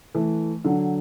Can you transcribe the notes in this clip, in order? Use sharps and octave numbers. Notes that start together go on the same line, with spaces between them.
E3 A3
D3 F#3